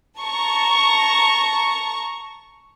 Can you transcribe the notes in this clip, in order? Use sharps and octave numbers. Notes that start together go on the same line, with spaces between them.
A5 A#5 C#6